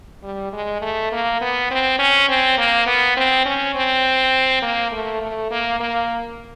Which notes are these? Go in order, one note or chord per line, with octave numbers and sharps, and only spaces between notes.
G3
G#3
A3
A#3
B3
C4
C#4
C4
A#3
B3
C4
C#4
C4
A#3
A3
A3
A#3
A#3